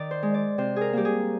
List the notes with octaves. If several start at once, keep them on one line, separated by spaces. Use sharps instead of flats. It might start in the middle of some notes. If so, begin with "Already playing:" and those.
Already playing: D#3 D5
C5
G#3
D5
C3 C5
G#4 A#4
G3 A#3 G4
G#4